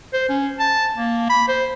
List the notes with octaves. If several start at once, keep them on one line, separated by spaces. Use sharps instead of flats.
C5
C#4
A5
A#3
B5
C5